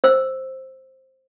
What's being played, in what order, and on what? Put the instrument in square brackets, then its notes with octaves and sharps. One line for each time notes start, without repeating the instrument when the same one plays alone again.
[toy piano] C5 E6